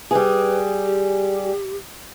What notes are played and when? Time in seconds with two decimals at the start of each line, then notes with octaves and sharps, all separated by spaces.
0.11 G3 G#4 B4
0.86 G4